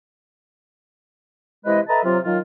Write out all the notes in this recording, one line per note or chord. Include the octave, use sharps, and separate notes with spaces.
C3 E3 G#3 E4 B4 D#5
A4 B4 D#5 E5 A5 A#5
C3 F#3 F4
D#3 F#3 F4